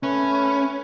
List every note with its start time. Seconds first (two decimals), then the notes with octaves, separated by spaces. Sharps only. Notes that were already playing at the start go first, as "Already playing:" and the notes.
0.03 A3 C#4 B4